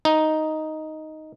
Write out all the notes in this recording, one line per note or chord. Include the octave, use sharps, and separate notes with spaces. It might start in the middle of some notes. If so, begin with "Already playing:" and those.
D#4